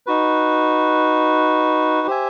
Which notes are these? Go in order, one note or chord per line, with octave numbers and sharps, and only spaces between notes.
D#4 F#4 B4
G4 C5 E5 G#5